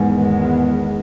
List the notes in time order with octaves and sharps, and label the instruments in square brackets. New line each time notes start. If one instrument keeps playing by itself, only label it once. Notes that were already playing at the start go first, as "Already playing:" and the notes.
Already playing: [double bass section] E2 D#3 G#3 B3 [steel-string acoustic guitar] G#2